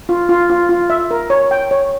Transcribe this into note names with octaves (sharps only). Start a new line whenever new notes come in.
F4
F4
F4
F4
E5
A#4
C#5
G5
C#5